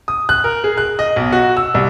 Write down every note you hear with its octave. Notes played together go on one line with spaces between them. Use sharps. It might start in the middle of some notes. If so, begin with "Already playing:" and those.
D#6
F#6
A#4
G#4
F#6
D#5
B1
F#4
E6
C2